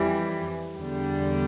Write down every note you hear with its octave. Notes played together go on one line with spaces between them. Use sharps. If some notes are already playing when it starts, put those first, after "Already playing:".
Already playing: F2 E3 G3
E2 D3 G3